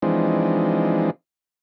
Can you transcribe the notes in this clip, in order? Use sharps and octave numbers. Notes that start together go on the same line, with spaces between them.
E3 F3 G#3 C4 D4 D#4